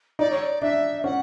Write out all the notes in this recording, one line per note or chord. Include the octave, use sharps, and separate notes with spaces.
D#4 D5
C#5
D5
D4 E5
C#4 F#5